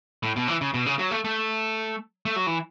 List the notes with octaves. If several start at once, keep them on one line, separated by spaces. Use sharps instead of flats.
A2
B2
E3
C#3
B2
C#3
F#3
A3
A3
A3
F#3
E3